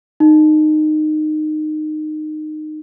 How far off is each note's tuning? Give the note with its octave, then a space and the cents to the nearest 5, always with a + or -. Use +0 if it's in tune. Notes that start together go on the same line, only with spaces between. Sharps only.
D#4 -20